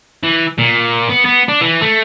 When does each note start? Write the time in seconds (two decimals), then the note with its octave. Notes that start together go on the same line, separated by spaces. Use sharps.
0.23 E3
0.58 A#2
1.09 B3
1.25 B3
1.48 D4
1.61 E3
1.81 A3